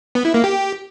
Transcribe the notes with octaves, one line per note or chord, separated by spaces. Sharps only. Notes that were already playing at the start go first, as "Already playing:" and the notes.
B3
E4
A#3
G4